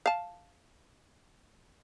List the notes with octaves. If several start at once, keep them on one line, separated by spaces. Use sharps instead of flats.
F5 A5